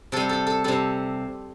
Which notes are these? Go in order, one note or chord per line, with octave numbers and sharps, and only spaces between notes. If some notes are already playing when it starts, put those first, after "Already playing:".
C3 G3 A4
A4
A4
C3 G3 A4